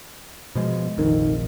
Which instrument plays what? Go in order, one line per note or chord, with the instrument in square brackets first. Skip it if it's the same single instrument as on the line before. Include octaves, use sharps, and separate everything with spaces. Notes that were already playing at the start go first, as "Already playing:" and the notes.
[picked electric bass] B2 F3 G#3
[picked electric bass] F1 A#1 F2 [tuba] D#3